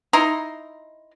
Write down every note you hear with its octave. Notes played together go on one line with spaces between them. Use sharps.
D#4 E4 A#5 C6